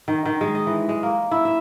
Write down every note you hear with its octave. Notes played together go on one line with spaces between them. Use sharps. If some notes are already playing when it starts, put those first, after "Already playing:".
D#3
D#3
G#3
D#5
E3
G#3
A#3
E4
E5